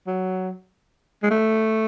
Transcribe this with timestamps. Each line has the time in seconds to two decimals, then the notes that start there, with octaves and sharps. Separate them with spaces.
0.07 F#3
1.23 G#3
1.31 A3